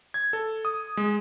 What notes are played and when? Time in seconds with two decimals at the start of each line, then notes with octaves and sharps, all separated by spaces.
0.14 G#6
0.33 A4
0.65 D#6
0.97 G#3